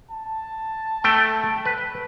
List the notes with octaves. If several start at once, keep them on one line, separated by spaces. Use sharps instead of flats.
A5
A3 G5
B4